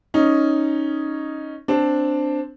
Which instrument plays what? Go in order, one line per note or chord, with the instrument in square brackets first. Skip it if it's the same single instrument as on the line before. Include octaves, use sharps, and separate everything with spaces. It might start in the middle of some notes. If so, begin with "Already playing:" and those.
[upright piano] C#4 D#4
C4 D4